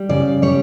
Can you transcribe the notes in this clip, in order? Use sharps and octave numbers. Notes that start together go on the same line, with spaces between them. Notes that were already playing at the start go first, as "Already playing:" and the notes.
Already playing: G3
C#3 D5
G3 C#5